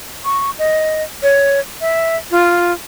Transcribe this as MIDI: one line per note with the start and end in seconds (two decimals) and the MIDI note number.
0.25 0.51 85
0.59 1.03 75
1.23 1.60 73
1.81 2.17 76
2.31 2.72 65